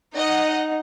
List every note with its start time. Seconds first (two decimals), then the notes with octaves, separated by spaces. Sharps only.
0.16 D#4 D#5 F#5